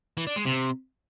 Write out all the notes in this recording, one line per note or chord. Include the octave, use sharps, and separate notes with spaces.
E3
D4
G#3
C3